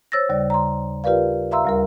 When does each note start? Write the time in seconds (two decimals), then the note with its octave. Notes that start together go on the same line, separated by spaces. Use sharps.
0.12 C5 C#5 E6 A6 A#6
0.29 D#2 C#3 G3 D5
0.50 A#5 C6
1.04 F4 G4 A#4 B4 D5 F5
1.51 E5 F5 A#5 C6 E6
1.65 D2 G3 A#4